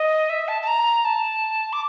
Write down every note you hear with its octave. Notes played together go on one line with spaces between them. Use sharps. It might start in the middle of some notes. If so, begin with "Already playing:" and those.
Already playing: D#5
E5
A5
A5
A#5
A5
D6